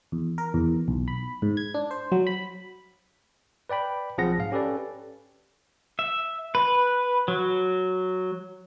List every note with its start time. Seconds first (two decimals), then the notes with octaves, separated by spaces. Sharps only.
0.12 E2
0.38 A#4
0.54 E2
0.88 B1
1.08 B5
1.42 G#2
1.57 G#6
1.74 D4
1.91 C5
2.12 F#3
2.27 B5
3.69 B4 D5 G5 B5
4.18 B1 F3 C4 G#4 F#5 A#6
4.38 G#2 F5
4.52 C#4 G4 A4 B4 D5
5.99 E5
6.55 B4
7.28 F#3